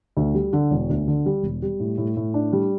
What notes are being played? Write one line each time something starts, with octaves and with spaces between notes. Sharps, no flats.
D2
G3
D3
E1
D2
D3
G3
E1
G3
A2
A2
A2
D4
G3